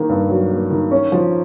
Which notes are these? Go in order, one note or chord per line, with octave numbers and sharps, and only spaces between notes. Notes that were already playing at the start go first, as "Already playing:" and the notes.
Already playing: D#3 A#3
G2
F#3
A#3
D#3
C#4
F3